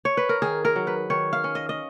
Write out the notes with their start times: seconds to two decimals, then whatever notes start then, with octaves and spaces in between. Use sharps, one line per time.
0.05 C#5
0.17 B4
0.29 A#4
0.42 D#3 G#4
0.65 A#4
0.76 F#3
0.87 B4
1.10 D#3 C#5
1.33 F5
1.44 C#4
1.55 D#5
1.69 D#5